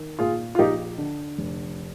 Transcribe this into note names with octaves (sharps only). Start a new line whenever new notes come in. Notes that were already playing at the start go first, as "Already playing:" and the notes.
Already playing: D#3
A#2 F4 G#4
F4
A#1 D#4 G4
D3
F1